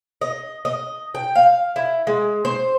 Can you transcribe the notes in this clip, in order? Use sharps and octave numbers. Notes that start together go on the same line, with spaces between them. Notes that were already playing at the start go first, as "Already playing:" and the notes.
D#5
D#5
G5
F5
E4
G#3
C5